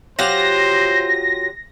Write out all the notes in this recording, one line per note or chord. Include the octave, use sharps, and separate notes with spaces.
F#3 F4 G4 C5 A#6